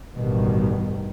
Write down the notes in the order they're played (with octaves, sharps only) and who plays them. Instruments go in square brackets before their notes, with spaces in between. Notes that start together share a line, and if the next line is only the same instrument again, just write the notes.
[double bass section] A1 G2 B2 D#3 G3